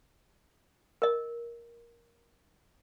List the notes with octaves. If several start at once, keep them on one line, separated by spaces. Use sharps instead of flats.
A#4 D#5